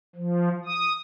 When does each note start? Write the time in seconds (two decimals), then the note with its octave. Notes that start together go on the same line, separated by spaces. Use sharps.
0.16 F3
0.65 D#6